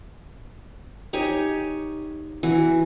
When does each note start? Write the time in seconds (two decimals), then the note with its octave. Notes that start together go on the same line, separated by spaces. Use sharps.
1.13 D#4 G4 C#5 G#5
2.43 E3 F#4